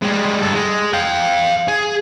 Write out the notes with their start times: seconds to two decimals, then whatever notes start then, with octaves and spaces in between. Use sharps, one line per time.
0.02 G3 G#3
0.41 G2 A4
0.54 G#3
0.93 F5 G5
1.68 G#4